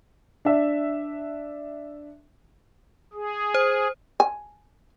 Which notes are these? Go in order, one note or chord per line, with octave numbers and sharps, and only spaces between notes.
D4 E5
G#4
C5
G#5